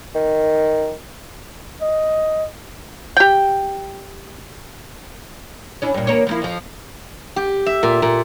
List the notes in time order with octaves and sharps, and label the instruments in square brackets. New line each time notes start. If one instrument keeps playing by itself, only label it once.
[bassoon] D#3
[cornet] D#5
[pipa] G4 G5
[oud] C#4 D4 E4
G2 A#2
E2 A#3 C#5
F3 A#3 E4
F2 F3
[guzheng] G4
E5
A#2
A#2